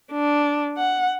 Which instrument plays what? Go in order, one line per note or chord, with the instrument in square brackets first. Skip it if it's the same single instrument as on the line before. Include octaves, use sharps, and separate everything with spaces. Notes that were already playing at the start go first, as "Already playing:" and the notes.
[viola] D4
F#5